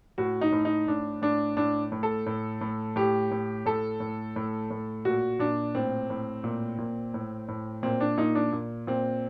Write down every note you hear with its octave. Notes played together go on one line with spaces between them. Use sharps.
A2 F#4
D#4
A2
D#4
A2 D4
A2 D4
A2 D4
A2
A4
A2
A2
A2 G4
A2
A2 A4
A2
A2
A2
A#2 F#4
A#2 D4
A2 C4
A2
A#2
A#2
A2
A2
A#2 C4
D4
A#2 D#4
D4
A#2
A#2 C4